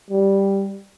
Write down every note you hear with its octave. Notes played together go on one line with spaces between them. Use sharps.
G3